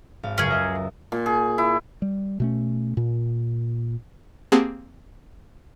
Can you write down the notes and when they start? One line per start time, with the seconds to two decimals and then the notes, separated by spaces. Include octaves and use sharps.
0.23 G#1 F5
0.38 C#2 F#2 C#4 G#4
0.50 D#5 E5 A#5
1.12 A#2
1.26 G#4
1.58 E4
2.02 G3
2.40 B2 A3 C#4
2.97 A#2
4.52 A#3 C4 G4 G#4 F#5 A5